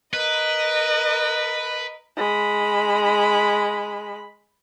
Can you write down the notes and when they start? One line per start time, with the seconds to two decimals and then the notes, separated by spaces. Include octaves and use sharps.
0.14 A#4 B4 D#5
2.16 G#3 B5